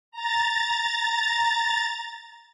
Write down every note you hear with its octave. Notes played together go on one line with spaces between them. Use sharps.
A#5 A6